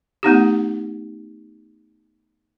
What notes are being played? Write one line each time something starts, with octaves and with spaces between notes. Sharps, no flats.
A3 B3 D#4 G4